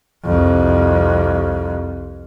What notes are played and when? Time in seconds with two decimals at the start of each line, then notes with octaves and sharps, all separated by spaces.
0.25 C2 F2